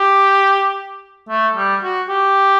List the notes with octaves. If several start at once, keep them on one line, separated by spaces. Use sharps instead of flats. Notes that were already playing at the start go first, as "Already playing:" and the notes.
Already playing: G4
A3
G3
F#4
G4